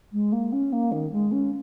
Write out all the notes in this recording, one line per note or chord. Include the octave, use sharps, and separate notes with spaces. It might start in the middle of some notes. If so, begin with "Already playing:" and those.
G#3
A#3
C#4
A#3
D#3
G#3
C#4